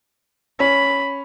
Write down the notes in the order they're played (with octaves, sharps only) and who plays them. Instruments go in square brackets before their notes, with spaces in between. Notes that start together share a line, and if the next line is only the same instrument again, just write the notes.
[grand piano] C#4 [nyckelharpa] B5